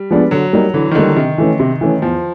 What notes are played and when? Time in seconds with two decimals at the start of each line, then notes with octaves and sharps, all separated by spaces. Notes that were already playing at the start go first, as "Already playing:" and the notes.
Already playing: G3
0.11 F3 G#3 B3 D4
0.31 D3 F#3
0.53 G3 A#3 D#4
0.74 D3 E3
0.91 D#3
0.95 D3 G3 A#3 D#4
1.16 C3 D#3
1.38 E3 A3 C#4
1.59 C3
1.81 E3 A3 C#4
2.02 E2 F3